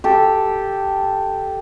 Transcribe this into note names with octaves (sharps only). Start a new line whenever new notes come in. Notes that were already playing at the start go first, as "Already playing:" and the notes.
G4 A4